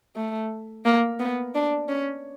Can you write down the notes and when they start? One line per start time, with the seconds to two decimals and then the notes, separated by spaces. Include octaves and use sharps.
0.16 A3
0.85 A#3
1.19 B3
1.55 D4
1.89 C#4